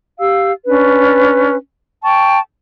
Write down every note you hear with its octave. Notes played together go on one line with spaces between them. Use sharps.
G4 F5 E6
C#4 D4 B4
G5 A5 C#6